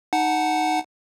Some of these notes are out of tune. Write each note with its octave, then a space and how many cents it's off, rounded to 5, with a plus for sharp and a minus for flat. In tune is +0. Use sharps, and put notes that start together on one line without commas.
D#4 +0 F#5 +0 A5 -15